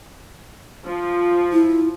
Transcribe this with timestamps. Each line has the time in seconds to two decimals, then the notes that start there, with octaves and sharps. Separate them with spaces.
0.85 F3
1.53 E4